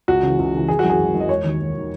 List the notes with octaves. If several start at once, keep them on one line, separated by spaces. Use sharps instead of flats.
C#2 F#4
C#3 E3
C#2
C#3 E3
G#1 G#4
F#4
F#2 E3
G#4
G#1
F#2 E3
D#5
E1 C#5
D#2 D#3
E1
D#3